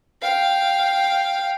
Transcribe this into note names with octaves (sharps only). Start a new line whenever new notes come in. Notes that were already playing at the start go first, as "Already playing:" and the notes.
F5 G5